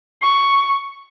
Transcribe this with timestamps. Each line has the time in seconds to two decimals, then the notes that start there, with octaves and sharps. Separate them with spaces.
0.22 C#6